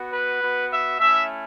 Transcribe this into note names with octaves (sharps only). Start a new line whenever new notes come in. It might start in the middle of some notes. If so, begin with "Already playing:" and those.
Already playing: B3 F#4
B4
B3 F#4
E5
A3 C#4 E4 E5